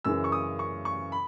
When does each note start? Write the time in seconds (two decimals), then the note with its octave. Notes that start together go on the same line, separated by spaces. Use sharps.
0.04 F#2 C#3 E3 E6
0.24 C#6
0.32 D#6
0.59 C#6
0.85 C#6
1.12 B5